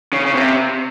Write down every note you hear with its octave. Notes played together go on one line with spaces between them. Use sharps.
C#3
C#3
C3